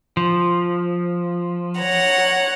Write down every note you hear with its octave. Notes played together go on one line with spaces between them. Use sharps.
F3
C#5 F#5 A#5